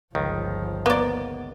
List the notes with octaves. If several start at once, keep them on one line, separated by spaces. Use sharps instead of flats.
G1 C#2 D#3 F3
A#3 B3 D5